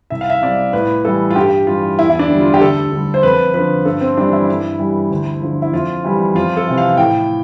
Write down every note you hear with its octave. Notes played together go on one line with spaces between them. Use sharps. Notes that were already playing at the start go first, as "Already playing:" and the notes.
C2 E5
F5
E5
C3 G3 D5
A2 B4
E3 G3 A4
F4
G2 G4
E3 G3 F4
E2 E4
E4
D4
D3 G3
F4
G4
D2 A4
D3 G3
C5
F2 B4
D3 F3 B4
G2 A4
C4
E3 G3 D4
E4
G2
E3 G3
D2
D3 F3
E4
F2 F4
E3 G3
F2 F4
A4
C3 E3
F5
A2 G5